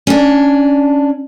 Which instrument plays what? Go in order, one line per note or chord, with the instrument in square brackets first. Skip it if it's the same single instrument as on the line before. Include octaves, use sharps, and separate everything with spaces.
[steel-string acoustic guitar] C#4 D4